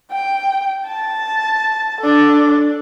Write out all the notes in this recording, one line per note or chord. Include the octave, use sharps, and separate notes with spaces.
G5
A5
D4 A4